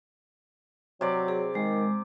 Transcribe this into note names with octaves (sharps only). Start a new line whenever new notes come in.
C3 F#3 D5
G#4
D#3 G#3